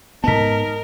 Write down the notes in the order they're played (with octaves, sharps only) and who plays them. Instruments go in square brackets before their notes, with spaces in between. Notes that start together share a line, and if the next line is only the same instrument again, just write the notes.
[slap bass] G#2 B3 [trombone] D#4 [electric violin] A#4 [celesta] A5 B6